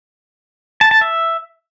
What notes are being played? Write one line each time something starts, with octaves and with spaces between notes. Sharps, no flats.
A5
A5
E5